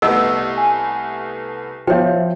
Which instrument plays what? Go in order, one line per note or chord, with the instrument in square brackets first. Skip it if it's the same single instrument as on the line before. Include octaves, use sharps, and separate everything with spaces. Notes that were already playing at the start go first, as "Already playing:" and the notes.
[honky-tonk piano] C2 A3 B3 [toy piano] A4 D#5 F#5 [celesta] E6
[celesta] G#5
[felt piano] F3 [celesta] C5 E5 [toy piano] C#5 G5